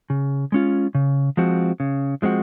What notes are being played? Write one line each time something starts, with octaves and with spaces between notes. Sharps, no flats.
C#3
G#3 C#4 F4
C#3
F3 G#3 C4 F#4
C#3
F3 G#3 C4 F#4